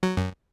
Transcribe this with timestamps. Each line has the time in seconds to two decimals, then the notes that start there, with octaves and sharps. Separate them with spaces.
0.03 F#3
0.17 F#2